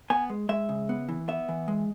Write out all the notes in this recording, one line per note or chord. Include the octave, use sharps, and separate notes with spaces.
B3 G#5
G#3
G#3 E5
C#3
B3
E3
B3 E5
E3
G#3